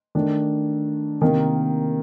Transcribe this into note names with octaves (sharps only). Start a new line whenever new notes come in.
D#3 A3 D4 A4
C3 D#3 A#3